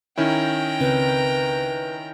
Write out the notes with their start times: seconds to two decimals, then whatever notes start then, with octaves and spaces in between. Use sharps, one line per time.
0.18 D#3 C#4 E4 G5 A#5
0.80 C#2 C#3 C4 B4